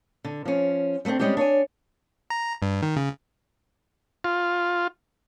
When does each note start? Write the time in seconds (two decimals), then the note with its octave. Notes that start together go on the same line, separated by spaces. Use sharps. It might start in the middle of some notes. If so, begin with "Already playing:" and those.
0.25 D3
0.45 F3 C#4
1.05 G3 A3 B3 C4 D4
1.19 G3 G#3 C4 C#4 G4
1.37 D4 C#5 D5 G#5
2.30 A#5
2.62 G2
2.82 D#3
2.96 C#3
4.24 F4